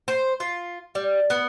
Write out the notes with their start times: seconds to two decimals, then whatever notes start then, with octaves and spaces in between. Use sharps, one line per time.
0.08 C5
0.40 F4
0.95 G3
1.30 B3